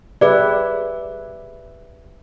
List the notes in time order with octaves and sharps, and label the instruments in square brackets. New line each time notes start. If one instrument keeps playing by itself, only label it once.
[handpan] G4 B4 E5 [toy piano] G#4 D5